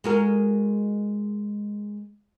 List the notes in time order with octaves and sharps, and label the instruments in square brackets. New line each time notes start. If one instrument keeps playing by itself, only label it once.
[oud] G#3 F#4 A#4